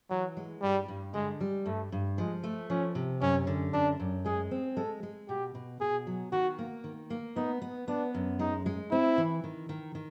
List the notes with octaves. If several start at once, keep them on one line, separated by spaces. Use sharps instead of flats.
E3 F#3
G#3
G2 G3
G2
D3 G#3
G3
G2 A3
G2
F3 G#3
A3
F3 C#4
C3
F#2 C#4
D3
F#2 D4
F#2
G#3 G#4
C4
G#3 A4
G#3
B2 G4
B2
B2 G#4
F#3
D#3 F#4
A#3
D#3
A#3
B3 D#4
B3
B3 D4
F#2
G#3 D#4
G#3
C4 E4
E3
D#3
D#3
D#3